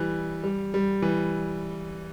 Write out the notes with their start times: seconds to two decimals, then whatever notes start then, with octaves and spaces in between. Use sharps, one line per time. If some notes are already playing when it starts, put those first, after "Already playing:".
Already playing: E3 G3
0.44 G3
0.74 G3
1.02 E3